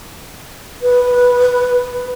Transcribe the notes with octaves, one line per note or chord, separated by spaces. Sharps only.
B4